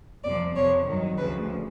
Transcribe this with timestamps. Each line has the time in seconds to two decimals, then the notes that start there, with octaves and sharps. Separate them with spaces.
0.23 F2 C3 F3 D5
0.55 F2 C3 F3 C#5
0.86 G2 D#3 F#3
1.17 D2 C#3 F3 B4